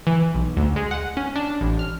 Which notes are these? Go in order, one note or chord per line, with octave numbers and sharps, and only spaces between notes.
E3
B1
D2
G#3
F#5
C#4
D4
A1
F6